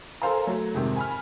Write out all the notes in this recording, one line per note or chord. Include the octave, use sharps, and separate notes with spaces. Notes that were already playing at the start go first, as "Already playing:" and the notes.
A4 A#4 C5 F5 G#5 A#5
F#3 A3 A4
F2 G#2 C3 D#3
G#5 B5 F6